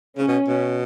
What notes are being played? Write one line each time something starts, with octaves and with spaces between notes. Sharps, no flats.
C#3 C#4
B2
B2